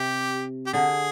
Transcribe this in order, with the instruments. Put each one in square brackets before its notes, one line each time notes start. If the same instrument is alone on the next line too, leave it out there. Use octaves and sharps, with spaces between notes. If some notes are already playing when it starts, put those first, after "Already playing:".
Already playing: [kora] C3 [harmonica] G4
[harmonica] G4
[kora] D3 [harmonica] G#4